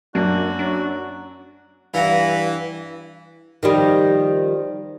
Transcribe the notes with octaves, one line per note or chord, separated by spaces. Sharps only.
F#2 A#3 D4 F#4
F#3 D4
G2 E3 F5 F#5 A#5
D#3 F3 G3